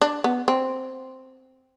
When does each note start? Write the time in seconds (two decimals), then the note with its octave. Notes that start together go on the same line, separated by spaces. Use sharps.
0.01 D4
0.24 B3
0.48 C4